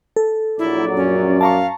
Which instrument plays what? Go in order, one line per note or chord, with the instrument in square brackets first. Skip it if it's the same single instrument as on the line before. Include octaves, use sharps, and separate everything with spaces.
[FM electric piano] A4
[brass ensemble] A#1 F#3 D5 [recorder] E4
[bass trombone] F#2 [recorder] C#4
[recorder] F5 [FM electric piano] A5 A#5 C#6